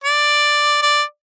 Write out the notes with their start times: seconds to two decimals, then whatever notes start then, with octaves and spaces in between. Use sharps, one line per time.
0.04 D5
0.82 D5